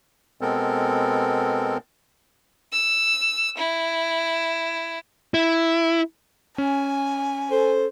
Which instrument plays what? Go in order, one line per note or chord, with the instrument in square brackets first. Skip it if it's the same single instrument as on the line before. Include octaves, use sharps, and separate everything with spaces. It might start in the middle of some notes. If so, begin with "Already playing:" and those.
[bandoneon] B2 G#3 B3 C4 A4 A#4
[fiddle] E6
E4
[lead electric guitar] E4
[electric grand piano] C#4 [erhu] G#5
[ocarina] A4 [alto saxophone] C5